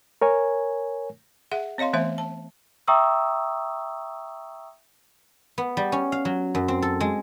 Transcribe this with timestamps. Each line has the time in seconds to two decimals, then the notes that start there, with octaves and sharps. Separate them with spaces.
0.22 A#4 C#5 G#5
1.52 G#4 E5 F#5
1.78 C4 C#5 D#5 F5 C6
1.93 E3 A3 B3 C5 E5
2.18 A5
2.88 E5 G5 A#5 C#6 D#6 E6
5.58 B3
5.77 G3
5.92 C#4
6.12 F5
6.25 F#3
6.55 F#2
6.68 C4
6.82 A4
7.00 G#3